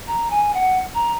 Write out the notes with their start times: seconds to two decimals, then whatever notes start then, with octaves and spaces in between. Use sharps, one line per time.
0.07 A#5
0.31 G#5
0.54 F#5
0.95 A#5